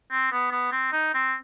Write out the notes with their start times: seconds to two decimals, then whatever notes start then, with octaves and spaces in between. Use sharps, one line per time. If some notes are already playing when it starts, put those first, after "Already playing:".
0.11 C4
0.32 B3
0.52 B3
0.72 C4
0.92 D#4
1.14 C4